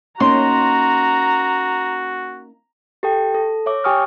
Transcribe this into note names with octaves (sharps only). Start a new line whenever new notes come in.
A#3 C#4 D#4 F#4 A#5 C6
G4 A4 G5
A4
C#5 E5 D6
G4 G5 G#5 C#6 D#6 F6